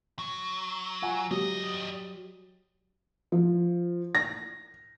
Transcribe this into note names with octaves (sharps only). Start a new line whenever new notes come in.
F#3
F4 F#5 G#5
F#3 G3 G4 D#5
F3
A#6